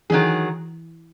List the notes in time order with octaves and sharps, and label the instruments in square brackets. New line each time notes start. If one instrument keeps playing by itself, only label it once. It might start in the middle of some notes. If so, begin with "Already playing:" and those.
[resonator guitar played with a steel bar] D#3 F#3 C#4 G#4 [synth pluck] E3